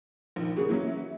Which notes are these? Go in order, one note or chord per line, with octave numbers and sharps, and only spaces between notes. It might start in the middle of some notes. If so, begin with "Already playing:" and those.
A#1 D#3
C#3 A#3 F#4 G#4
E3 F#3 A#3 C#4
E5